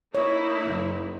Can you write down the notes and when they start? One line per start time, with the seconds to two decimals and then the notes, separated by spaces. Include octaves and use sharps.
0.15 A#3 D#4 E4 C#5
0.64 F#1